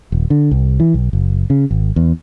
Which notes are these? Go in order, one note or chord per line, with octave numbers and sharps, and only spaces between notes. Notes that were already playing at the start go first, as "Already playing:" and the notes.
D#1
D3
C2
E3
B1
F#1
C#3
G#1
E2